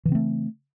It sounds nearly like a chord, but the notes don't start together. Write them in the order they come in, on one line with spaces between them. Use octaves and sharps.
E3 C#3 C4 A3